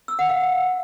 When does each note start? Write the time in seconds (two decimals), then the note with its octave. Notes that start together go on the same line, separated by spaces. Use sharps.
0.08 E6
0.19 F#5
0.29 F5